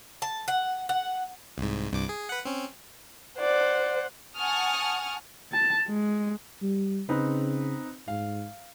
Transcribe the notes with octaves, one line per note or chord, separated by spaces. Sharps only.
A5
F#5
F#5
C2 G#2
C2 G2 D6
G#4
B4 F#5
C4 C#4
C5 D5 F#5
F#5 G#5 A5 C#6 D#6 F6
A5
G#3
G3
C#3 C4 D#4 B4
G#2 F5